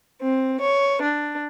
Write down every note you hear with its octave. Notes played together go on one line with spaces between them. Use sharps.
C4
C#5
D4